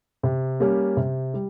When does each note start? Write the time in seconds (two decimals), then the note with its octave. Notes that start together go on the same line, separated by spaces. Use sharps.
0.23 C3
0.60 G3 A#3 C#4 G4
0.97 C3
1.34 G3